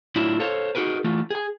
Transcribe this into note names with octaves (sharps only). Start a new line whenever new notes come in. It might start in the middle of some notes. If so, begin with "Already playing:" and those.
A2 F#3 D4 E4 F4
A4 C5 C#5 F5
D#4 F#4 G#4 A#4 B4
E3 A3 F4
G#4 G#5